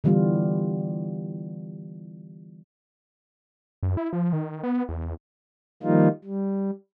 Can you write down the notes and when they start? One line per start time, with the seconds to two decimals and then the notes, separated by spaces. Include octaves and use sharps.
0.04 D3 E3 G3 B3 F4
3.83 F#2
3.97 E4
4.13 F3
4.33 D#3
4.63 B3
4.89 E2
5.83 D#3 F3 G3 A#3 D#4 F4
6.24 G3